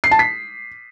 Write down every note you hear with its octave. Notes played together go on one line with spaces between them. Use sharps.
C7
A5
B6